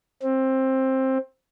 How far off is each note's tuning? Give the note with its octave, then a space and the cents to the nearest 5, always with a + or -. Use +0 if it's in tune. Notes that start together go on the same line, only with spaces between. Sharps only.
C4 +15